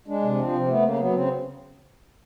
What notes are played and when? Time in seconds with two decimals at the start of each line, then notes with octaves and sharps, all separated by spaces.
0.08 G#3 D4
0.22 C3
0.37 F3 C4
0.53 C3
0.68 A3 B3
0.82 C#3 A#3
0.98 F#3 B3
1.13 C#3 C4